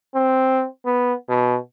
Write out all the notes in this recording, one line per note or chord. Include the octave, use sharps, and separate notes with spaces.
C4
B3
B2